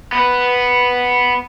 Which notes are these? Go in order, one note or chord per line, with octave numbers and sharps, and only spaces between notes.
B3 B4